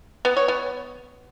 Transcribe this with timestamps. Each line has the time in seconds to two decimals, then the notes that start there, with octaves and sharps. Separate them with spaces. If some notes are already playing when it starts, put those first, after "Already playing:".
0.25 B3
0.37 C#5
0.48 B3